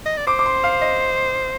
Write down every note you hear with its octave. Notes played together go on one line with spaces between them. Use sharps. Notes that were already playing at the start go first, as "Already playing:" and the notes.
D#5
D5
C5 D6
D6
C6
F5
D#5